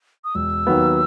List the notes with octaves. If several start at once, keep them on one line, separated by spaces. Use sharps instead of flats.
D#6
E1 E6
D#2 D#3 F#3 B3